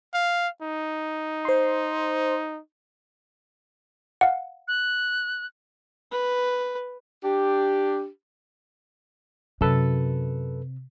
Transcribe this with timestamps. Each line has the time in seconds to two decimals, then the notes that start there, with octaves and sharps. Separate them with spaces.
0.14 F5
0.62 D#4
1.45 C5 C6
4.21 F5 F#5
4.68 F#6
6.12 B4
7.23 D4 G4
9.61 F#2 C3 A4 B4